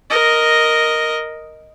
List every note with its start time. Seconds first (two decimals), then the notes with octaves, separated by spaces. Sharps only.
0.10 A#4 D#5